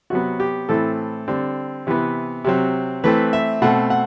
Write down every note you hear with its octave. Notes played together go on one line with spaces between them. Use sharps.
C3 F#3 B3 F#4
G4
A2 E3 A3 C4 A4
D3 G3 C4
C3 E3 B3
C3 F#3 C4
E3 A3 C4 B4
E5
B2 A3 C4 F#5
F#5